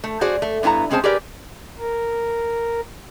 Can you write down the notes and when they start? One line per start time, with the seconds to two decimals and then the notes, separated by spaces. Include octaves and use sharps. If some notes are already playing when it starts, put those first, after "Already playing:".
0.04 A3
0.21 F#4 G#4 C5 D5
0.42 A3
0.63 G2 B3 E4 G#5 A#5
0.90 G#3 C4 C#4 G#4 C5 A5
1.04 G4 G#4 A#4 B4 D5
1.79 A#4